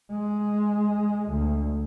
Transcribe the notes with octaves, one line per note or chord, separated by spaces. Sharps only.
G#3
D2